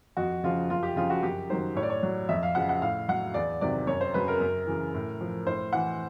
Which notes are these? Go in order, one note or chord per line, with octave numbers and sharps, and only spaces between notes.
F2 F#4
C#3 F3 F4
F#2 F4
G4
C#3 F3 F4
F#4
F#2 G4
D#3 F#3 C5
A2 C#5
D5
C#5
F#3
F2 E5
F5
C#3 F3 F#5
F#5
A2 F5
F#3 F#5
E2 D5
C3 D#3 F#3 D5
F#2 C#5
C5
C#3 F#3 B4
A#4
F#2
C#3 E3
A2
F3
A2 C5
E3 F#5